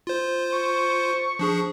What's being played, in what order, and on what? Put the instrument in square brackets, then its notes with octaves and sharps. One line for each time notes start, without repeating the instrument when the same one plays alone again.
[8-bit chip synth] F4 C5
[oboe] C#6
[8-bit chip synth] F3 D4 G#4